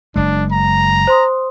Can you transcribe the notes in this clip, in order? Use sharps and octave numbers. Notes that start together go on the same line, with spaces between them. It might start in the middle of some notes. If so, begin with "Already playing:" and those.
F#1 G#3 D4
A#5
C5 C6 D#6